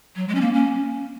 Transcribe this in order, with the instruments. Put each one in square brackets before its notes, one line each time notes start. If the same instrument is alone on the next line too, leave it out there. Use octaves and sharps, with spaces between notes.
[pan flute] F#3
G#3
C#4
A#3
C#4